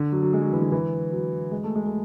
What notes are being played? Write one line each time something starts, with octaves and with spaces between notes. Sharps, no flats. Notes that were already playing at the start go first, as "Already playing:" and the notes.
Already playing: D3
F#3
F#3
G#3
F#3
E3
D3
E3
F#3
G#3
A3
G#3
A3